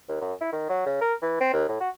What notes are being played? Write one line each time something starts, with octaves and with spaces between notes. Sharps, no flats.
D#2
F#2
E4
D#3
F#3
C#3
A#4
E3
C4
D#2
A2
F#4